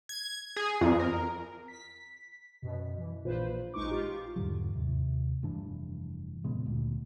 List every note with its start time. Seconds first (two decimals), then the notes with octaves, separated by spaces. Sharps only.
0.09 G#6
0.56 G#4
0.81 F2
0.99 A#4
1.68 B6
2.62 F#2 B2
2.98 E3
3.24 A#1 A#2 F4 B4 C5
3.74 A1 G#3 D#4 C#6 D6
3.91 F4 G4
4.36 E2 G#2 D3 F#3
4.73 D#2 C3
5.43 F1 G2 E3 D4
6.44 A#2 C#3 G#3 B3
6.66 D2 A#2